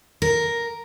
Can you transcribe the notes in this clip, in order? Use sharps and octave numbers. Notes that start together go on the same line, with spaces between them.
A#4